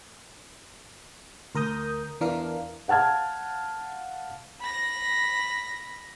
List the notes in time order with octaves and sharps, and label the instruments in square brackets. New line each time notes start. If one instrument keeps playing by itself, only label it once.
[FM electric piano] D2 A#4 A#5 D#6 G6
E2 E3 D4 A#4 F5
[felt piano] F5 F#5 A5 F6 G#6
[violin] B5 A#6